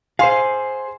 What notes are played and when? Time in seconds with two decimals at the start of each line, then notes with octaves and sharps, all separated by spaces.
0.19 G#4 C5 F5 G#5 C6